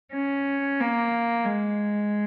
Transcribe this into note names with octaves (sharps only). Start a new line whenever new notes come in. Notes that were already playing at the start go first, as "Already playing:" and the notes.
C#4
A#3
G#3